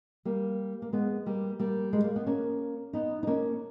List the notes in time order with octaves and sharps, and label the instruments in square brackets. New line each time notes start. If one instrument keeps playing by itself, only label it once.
[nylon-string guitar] G3 A#3
A#3
G#3 B3
G3 A#3
G3 A#3
G#3
A#3
B3
A#3 C#4
B3 D#4
D#4
A#3 C#4